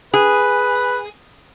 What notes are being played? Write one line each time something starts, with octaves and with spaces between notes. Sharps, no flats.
G#4 B4